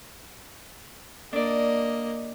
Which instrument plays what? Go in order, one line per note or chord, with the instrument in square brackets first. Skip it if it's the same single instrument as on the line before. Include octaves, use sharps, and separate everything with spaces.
[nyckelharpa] A#3 D#5 [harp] D4 D5